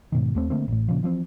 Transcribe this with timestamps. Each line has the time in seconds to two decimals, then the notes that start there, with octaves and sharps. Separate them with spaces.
0.12 G#2 B2 D#3
0.35 D#2 A3 C4
0.50 D3 A3 A#3 C4
0.68 A1 A2
0.88 A#2 C#3 F3
1.03 E3 F3 A3 C4